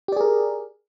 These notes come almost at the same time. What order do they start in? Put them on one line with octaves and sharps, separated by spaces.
G4 D5 G#4 A#4